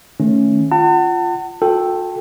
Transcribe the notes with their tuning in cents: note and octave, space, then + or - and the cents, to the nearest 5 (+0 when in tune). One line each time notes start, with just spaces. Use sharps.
D#3 +0 A3 +0 C#4 +0
F4 -5 F#5 +30 A5 +40
F#4 -45 A4 +0 G5 +0